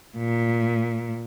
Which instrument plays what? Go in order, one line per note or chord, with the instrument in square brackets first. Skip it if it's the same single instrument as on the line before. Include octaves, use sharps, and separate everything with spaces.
[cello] A#2